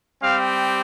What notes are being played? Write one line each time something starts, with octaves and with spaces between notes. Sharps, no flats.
G3 C4 G4 F5